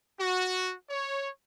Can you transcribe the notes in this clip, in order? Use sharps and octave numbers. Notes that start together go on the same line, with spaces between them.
F#4
C#5